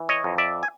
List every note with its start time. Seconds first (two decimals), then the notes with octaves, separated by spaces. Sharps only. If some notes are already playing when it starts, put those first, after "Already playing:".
Already playing: E3
0.09 C#5 D#5
0.24 F2
0.38 D5 E5
0.63 G#5